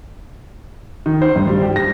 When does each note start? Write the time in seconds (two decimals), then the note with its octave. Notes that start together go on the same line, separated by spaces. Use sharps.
1.06 D#3
1.22 C5
1.36 G2
1.47 G3
1.63 G4
1.76 A#6